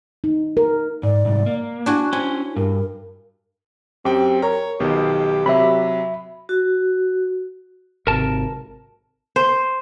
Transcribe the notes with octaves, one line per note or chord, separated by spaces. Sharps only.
D#4
A#4
G#2 D5
C2 G#2
A#3
D4 E4 F#4 G#5
C#4 C5 G#5
G2 A#4
F#2 C4 G4 G5
A#4 C#5 A#5
B1 B2 D#3 G4
C3 F#3 E5 B5
F#4
G#1 C3 A#4 A5
C5